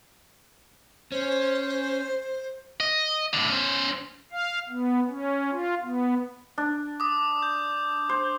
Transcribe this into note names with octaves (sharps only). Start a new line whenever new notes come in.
C#4 C5
D#5
A2 D3
C#4 C5
F5
B3
C#4
F4
B3
D4
D6 D#6
G6
C5